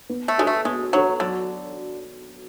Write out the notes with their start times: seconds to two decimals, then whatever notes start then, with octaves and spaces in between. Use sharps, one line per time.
0.09 B3
0.28 A3
0.37 G#3 D4 F#4 A4 C#5
0.47 A3
0.65 G#3 B3
0.93 F#3 D4 F#4 A4 C#5
1.20 D3 F#3